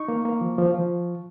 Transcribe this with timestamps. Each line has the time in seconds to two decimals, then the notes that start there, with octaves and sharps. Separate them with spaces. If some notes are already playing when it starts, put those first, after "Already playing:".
Already playing: D#4 C#6
0.08 A#3
0.25 A#3
0.41 F3
0.58 F3
0.74 F3